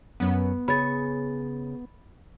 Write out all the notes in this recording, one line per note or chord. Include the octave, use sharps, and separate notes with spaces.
F#2 B3 C#4
C#3 G#4 C#5 B5 A6